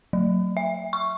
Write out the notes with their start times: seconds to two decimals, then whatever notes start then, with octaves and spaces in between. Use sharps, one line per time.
0.13 F#3
0.57 E5
0.93 C#6